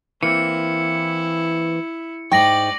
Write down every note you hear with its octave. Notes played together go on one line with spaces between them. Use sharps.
E3 A#3 C4 E4 C#7
G#2 D#4 D5 G5 C#6 A#6 F#7